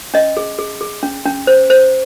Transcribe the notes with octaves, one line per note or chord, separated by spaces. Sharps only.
C#4 D#5
G#4
G#4
G#4
C#4
C#4
C5
C5